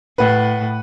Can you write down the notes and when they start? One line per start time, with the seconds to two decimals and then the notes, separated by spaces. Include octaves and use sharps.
0.18 A2 B4 F#5